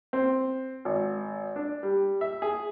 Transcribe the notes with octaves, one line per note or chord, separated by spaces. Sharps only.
C4
G#1
D4
G3
E5
G#4